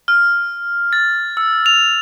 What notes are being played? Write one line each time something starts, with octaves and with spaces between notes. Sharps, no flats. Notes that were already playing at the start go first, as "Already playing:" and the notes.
F6
A6
E6
F7